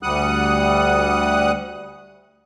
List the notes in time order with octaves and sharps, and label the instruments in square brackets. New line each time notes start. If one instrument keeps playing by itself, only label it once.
[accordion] D2 G3 F#5 D#6 F#6